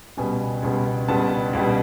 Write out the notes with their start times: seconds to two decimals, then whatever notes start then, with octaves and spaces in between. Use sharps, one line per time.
0.17 C#2 B2 G3 B3 G#5
0.62 C#2 B2 G3 B3
1.08 C#2 B2 G3 B3 A5
1.53 C#2 B2 G3 B3